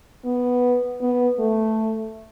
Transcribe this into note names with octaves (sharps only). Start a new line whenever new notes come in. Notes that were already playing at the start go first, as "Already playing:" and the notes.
B3
B3
A3